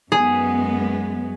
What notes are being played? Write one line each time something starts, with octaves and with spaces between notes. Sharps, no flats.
F#2 G#3 B3 G#4